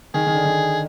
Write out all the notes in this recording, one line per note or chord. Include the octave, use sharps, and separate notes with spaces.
D#3 G#4
D#3
D3
D#3